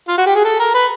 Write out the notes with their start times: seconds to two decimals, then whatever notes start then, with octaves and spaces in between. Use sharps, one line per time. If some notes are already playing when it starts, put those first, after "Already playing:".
0.08 F4
0.18 F#4
0.26 G4
0.35 G#4
0.45 A4
0.60 A#4
0.74 B4